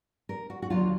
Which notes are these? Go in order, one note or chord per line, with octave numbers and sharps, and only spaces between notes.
A#4
F#4
F#4
D#2 D3 F#3 A#3 F4